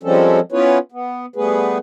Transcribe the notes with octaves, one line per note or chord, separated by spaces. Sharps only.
F3 G3 G#3 C4 C#4 A4
B3 C#4 E4 F4 B4 C#5
B3
G3 A3 B3 G#4 B4